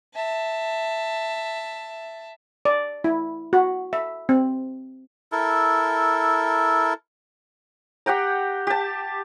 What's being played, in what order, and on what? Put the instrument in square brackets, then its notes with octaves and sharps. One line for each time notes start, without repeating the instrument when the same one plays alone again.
[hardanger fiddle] E5 A5
[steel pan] D5
E4
F#4
E5
C4
[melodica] E4 A4 A#4
[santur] G4 F#5 G5 A#5
G4 A5